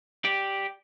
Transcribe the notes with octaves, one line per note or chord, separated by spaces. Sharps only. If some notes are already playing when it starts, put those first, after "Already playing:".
G4 D5